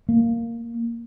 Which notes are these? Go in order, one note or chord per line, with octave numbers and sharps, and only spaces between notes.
A#3